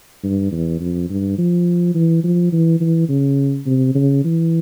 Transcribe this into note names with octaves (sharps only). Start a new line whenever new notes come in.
G2
E2
F2
G2
F3
E3
F3
E3
E3
C#3
C3
C#3
E3